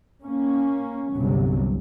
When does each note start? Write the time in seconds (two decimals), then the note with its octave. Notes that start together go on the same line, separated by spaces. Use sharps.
0.24 A#3 C#4
1.14 G1 C2 F#3